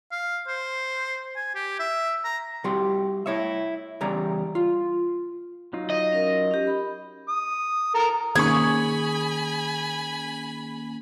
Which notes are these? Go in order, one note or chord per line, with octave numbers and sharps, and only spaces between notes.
F5
C5
G#5
G4
E5
A#5
C3 G3 F#4 G4 C6
E4 C#5 E5
E2 C#3 G3 A#5
F4
F#3 D#4 F4
D#5
C#4 A#4
C#4 G4
B5
D#6
A4 A#4 A#5
D#3 A#3 C#4 G#4 G#5 B5 C#6 G#6